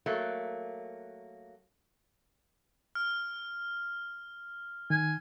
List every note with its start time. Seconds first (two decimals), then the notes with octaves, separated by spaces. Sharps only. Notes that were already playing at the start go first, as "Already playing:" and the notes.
0.06 F#3 A3 A#3
2.95 F6
4.90 D#3 G#5